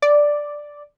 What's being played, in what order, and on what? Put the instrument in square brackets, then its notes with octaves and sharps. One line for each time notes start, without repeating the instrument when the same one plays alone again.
[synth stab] D5